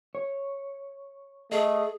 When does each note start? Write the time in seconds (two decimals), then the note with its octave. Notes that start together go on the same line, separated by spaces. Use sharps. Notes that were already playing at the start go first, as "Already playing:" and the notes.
0.15 C#5
1.52 A3 G#4 D#5